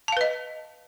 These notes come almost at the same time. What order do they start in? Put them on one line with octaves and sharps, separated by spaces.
A5 F5 B4 D#5